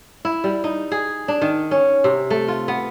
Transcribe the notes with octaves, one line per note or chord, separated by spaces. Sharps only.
E4
G3
D#4
G#4
D4
D#3
C#4
C3
A3
F4
B3